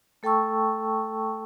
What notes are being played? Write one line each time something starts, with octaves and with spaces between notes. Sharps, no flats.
A3 A4 G5 A5 C#6 E6